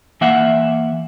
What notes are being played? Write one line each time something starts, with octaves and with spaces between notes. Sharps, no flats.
E3 A#3 E5 F#5